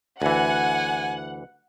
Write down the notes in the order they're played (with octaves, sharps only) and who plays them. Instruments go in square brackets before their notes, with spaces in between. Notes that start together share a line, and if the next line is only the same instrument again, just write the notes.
[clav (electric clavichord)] D2 E3 [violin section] F#5 [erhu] G#5